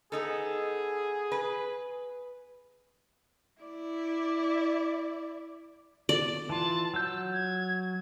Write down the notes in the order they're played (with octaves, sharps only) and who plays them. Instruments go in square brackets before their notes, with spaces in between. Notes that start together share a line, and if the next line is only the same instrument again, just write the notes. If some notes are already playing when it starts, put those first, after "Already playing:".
[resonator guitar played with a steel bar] B3 D#4 A4 [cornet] G#4
[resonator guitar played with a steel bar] B4
[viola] E4 D5
[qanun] D5
[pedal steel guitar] E3 F4 [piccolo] A5
[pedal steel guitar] F#3 G6 [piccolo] E6
[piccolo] G#6